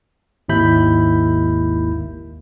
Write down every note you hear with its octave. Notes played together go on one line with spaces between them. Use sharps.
G#1 D#2 E4 B5 G6